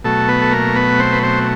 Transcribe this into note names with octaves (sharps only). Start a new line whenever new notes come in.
B2 F#3 A3 A4
B3 B4
A4
A#3 A#4
B3 B4
C4 C5
B4
C4 C5